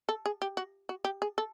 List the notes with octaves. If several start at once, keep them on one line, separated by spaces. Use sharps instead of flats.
A4
G#4
G4
F#4
F#4
G4
G#4
A4